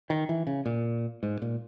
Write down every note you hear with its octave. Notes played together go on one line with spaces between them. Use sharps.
D#3
E3
C#3
A#2
G#2
A#2